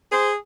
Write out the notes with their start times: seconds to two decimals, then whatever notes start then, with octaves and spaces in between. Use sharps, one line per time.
0.10 G#4 C5